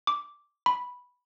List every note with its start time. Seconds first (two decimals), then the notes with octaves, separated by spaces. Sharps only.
0.07 D6
0.66 B5